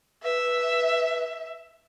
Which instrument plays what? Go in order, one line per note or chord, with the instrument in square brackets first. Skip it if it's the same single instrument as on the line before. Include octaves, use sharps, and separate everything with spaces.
[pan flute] B4 [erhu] E5